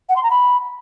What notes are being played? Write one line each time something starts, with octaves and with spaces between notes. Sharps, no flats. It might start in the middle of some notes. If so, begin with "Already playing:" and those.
F#5
C6
A#5
B5